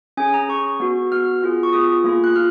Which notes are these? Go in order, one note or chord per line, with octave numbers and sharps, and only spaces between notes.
C#4 G#4 G#5
A#5
C#4 G#4 C#6
B3 F#4
B3 F#4 F6
B3 F4 G#4
C#6
B3 F4 G#4 D#6
A#3 F4 G#4
F#6
F4 F6